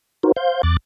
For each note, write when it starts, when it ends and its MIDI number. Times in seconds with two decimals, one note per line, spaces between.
0.23 0.32 63
0.23 0.32 66
0.23 0.32 70
0.23 0.32 72
0.36 0.62 72
0.36 0.62 77
0.36 0.62 91
0.63 0.77 40
0.63 0.77 86
0.63 0.77 90
0.63 0.77 93